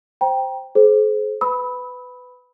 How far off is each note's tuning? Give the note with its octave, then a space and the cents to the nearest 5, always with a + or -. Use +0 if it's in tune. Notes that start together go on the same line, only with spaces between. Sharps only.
C5 +0 G5 +0 A#5 +30
G#4 +45 C5 +0
B4 +20 B5 +0 E6 -45